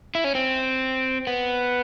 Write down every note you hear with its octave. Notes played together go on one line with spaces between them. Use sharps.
E4
C#4
C4
B3